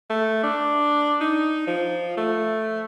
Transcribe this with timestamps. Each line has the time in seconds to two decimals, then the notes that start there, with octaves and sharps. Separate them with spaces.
0.10 A3
0.43 D4
1.21 D#4
1.67 F3
2.17 A3